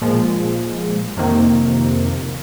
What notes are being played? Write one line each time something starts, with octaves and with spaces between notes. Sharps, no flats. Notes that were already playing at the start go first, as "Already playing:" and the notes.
A#2 F3 G#3
F2 C3 D#3 A#3